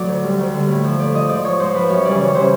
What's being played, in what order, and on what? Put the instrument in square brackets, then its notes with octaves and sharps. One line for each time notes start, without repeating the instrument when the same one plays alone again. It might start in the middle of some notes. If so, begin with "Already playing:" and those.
Already playing: [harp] A2 F#3 D5
D2
D3 G3
D2
D3 G3
A2
F3
A2 D5
F3 D#5
G#2 D5
F3 C#5
G#2 C5
F3 B4
F#2 C#5
C#3 E3 G3 D5
F#2 C#5
C#3 E3 G3 C5